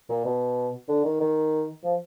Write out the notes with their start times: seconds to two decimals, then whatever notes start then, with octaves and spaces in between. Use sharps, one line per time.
0.09 A#2
0.25 B2
0.88 D3
1.04 D#3
1.20 D#3
1.83 F3